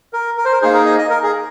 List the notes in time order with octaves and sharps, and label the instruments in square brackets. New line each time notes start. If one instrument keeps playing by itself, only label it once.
[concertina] A#4
A#4
C5
A#4
A#3 D#4 G#4 C5
A#4
D#5
D#5
A#4
G#4